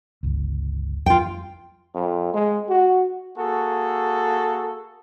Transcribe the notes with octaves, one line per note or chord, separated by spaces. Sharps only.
G1 C#2
F2 F4 G5
F2
G#3
F#4
A#3 F#4 G#4 A4